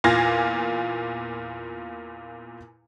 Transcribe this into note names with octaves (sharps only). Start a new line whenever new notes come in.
E2 A#2 F4 F5 G#6 A#6